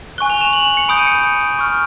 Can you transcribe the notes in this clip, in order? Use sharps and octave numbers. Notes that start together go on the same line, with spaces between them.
G#5 C#6 F#6 G7
F7
E7
F#7
F#7
C#7
B5 D#6 G6 D7
D#7
C#7
C#6 F6